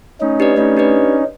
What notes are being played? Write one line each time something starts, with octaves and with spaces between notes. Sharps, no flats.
A3 C#4 D#4
D4 G4 B4 D5
A3 C#4 D#4
D4 G4 B4 D5